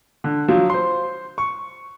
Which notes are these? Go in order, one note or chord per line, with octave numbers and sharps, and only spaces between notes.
D3
F3 F#3
C5 C6
C#6